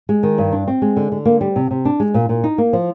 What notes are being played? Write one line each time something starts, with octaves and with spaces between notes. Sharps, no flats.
G#3
D#3
G2
D4
C4
G#3
D3
D3
A#3
G3
C3
C3
D4
G#3
A#2
A#2
D#4
A#3
F3